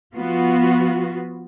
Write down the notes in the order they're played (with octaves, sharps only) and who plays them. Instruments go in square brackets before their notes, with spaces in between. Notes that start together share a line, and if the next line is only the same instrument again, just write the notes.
[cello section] F3 B3 F4 F#4